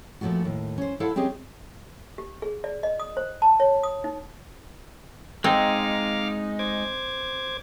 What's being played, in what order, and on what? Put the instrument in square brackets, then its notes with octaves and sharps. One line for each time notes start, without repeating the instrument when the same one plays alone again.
[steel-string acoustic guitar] A#2 F3 A3 B3 F#4
D#2 A2
C#4 C5
E4 A4 C5 F5 F#5
C4 C#4 G4 G#4 D#5
[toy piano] G4
G#4
D5
D#5
D#6
C5
A5
C#5
D#6
D#4
[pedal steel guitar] G#3 D#4 [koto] C4 [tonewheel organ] F5 D6 F6
[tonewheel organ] C5 D6 G#6